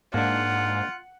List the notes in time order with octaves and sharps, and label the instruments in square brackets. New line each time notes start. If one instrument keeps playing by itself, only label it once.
[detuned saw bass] G#2 [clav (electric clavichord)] A#3 D4 [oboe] F4 [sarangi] F#5